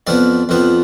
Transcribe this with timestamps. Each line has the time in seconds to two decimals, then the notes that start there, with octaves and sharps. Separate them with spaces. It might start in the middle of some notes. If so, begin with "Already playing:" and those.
0.07 F2 F3 B3 D5
0.49 F2 F3 B3